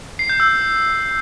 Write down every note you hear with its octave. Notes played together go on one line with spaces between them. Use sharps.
C7
G6
E6